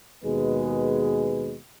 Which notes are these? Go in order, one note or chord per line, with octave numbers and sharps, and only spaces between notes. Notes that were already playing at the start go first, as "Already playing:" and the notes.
D#2 B2 G#3 G#4 B4